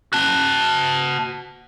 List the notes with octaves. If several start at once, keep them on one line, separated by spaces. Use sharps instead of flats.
F#4 A5